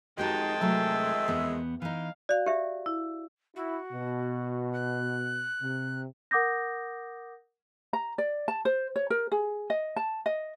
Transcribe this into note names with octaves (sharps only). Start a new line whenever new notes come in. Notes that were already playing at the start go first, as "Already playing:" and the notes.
F2 D#3 G#3 D#4 F#4 G4 G5 A5
C3 F#3 A3 E5
E2 B3
E3 D#4 F5
F#4 D5 F5
G4 E5
E4
E4 F#4
B2
F#6
C3
A#4 F#5 D6 D#6 G6 A#6
A#5
D5
A5
C5
C#5
A#4
G#4
D#5
A5
D#5